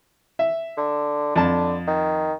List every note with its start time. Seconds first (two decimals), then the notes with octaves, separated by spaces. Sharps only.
0.39 E5
0.77 D3
1.36 F2 D3 A5
1.87 D#3